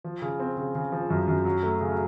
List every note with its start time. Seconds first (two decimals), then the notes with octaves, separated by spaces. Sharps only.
0.04 F3
0.22 C#3
0.40 C4
0.57 C#3
0.75 C#3
0.92 F3
1.10 F#2
1.28 F#2
1.45 F#3
1.63 A3
1.81 C#3